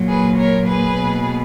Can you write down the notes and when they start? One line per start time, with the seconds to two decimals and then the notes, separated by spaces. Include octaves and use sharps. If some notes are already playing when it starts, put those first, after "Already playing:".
Already playing: A#2 F#3 A#3
0.08 G#4 B4
0.38 A#4 C#5
0.67 G#4 B4
0.96 B2 A#3